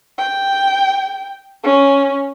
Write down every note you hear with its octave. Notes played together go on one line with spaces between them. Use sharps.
G5
C#4